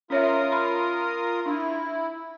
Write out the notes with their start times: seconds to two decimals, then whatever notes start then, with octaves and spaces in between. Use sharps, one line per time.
0.10 C#4 F4 A#4 C#5 E5 D#6
0.52 B5
1.46 D4 E4